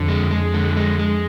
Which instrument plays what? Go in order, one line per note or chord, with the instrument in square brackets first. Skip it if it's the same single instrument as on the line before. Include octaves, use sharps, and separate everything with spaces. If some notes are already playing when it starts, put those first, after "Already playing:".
Already playing: [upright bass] F2 [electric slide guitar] D3
[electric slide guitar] G#3
G#3
D3
G#3
G#3